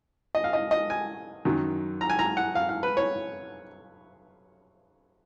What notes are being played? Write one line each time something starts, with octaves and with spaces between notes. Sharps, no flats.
D#5
F5
D#5
D#5
G#5
F#2 D#3 F#3
A#5
G#5
A#5
F#5
F5
F5
B4
C#5